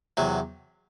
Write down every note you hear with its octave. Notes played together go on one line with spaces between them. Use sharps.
E2 C3 F#3